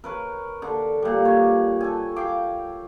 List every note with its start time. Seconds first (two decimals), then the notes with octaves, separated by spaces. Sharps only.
0.04 A#4 B4 C#5
0.62 D3
1.02 A#2 G3
1.25 C#5
1.81 A4 G#5
2.16 F5 G5 D6